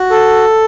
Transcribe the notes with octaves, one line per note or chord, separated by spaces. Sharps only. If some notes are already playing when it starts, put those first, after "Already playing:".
Already playing: F#4
A4